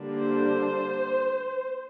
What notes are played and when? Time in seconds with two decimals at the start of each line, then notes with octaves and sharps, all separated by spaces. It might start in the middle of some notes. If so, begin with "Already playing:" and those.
Already playing: D3 G3 A#3 D4
0.18 C5